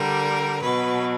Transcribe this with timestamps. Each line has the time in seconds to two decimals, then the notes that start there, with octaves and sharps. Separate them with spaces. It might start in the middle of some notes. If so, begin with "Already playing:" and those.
Already playing: D3 G3 A#4
0.62 B2 F#3 B4